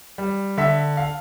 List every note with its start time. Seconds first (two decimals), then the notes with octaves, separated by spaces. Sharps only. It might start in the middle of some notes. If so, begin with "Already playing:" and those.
0.18 G3
0.57 D3 E5
0.97 F5